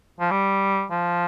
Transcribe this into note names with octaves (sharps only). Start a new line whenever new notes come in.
F3
G3
F3